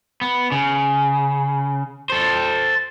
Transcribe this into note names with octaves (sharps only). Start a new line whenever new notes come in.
B3
C#3
A4 C5